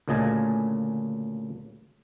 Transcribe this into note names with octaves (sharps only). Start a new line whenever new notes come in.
D2 A#2 C#3 D#5 G#5 A5